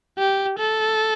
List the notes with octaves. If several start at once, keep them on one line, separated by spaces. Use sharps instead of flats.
G4
A4